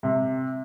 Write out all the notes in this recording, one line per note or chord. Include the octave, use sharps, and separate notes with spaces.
C3